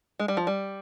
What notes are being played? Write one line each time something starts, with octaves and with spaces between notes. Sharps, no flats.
G#3
G3
F3
G3